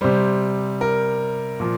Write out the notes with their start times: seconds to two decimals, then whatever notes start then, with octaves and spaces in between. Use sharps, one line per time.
0.01 C3 G3 C5
0.81 A#4
1.60 A#2 F3